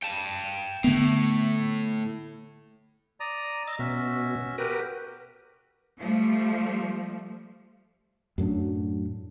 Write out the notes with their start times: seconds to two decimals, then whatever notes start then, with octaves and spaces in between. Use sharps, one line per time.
0.03 G5 A5
0.84 A2 D3 B3
3.20 D5 A#5 D#6
3.67 D#5 E6 A6
3.79 B2 C#4 F#4 E5
4.58 F#4 G4 A#4 B4
5.99 F3 G3 A3
8.38 F#2 A2 F#3 D4